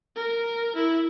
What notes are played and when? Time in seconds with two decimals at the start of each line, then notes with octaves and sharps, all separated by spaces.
0.16 A#4
0.76 E4